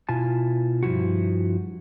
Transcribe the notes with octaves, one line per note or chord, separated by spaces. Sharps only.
B2 E4 F4 G#5 A5
G2 F3 E4 F#4